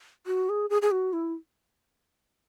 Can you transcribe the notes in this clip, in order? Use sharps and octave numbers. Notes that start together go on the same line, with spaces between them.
F#4
G#4
G#4
G#4
F#4
E4